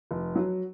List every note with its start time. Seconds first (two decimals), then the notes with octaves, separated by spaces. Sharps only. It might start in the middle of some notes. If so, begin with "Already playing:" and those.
0.11 F1
0.36 F#3